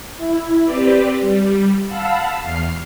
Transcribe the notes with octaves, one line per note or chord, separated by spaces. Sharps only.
E4
C4 G4 B4 D5
G3
F5 F#5 A5 B5 E6
E2 F6 C7